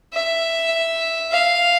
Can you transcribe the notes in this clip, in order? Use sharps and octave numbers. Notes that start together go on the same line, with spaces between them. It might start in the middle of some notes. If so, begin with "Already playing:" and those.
E5
F5